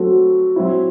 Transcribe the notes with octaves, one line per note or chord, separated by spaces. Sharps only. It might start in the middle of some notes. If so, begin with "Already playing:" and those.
Already playing: F#3 A3 C4 F#4 A4
F#3 C4 E4